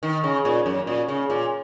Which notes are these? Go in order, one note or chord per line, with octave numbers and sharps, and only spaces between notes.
D#3
C#3
A#2
F#2
A#2
C#3
A#2